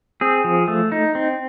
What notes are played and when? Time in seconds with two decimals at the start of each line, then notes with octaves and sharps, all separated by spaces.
0.21 C4 G#4
0.44 F3
0.68 A3
0.92 D#4
1.15 C4